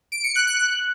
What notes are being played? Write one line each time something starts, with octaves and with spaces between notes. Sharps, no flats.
D7
C#7
F#6
F#6
F#6